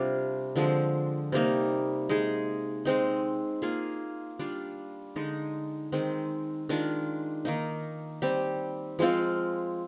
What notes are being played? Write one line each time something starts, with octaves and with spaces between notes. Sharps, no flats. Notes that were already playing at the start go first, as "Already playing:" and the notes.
Already playing: C3 G3 D4 F4
D3 F3 G#3 C4
C3 G3 A#3 D#4
G#3 D#4 G#4
G#3 C4 D#4
A#3 F4 G#4
G3 D4 F4
D3 G#3 D#4
D#3 G#3 C4
D#3 G#3 D4 F4
D#3 A#3 D#4
G3 C4 G4
F3 G#3 C4 F4